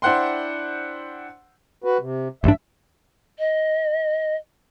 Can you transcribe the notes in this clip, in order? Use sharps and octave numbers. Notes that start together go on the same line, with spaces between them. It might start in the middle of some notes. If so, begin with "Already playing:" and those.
D4 E4 C5 F#5 G5 C6
F#4 B4
C3
A1 G2 D4 E5
D#5